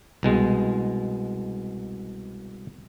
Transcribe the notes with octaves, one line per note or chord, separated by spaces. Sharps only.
C2 B2 G#3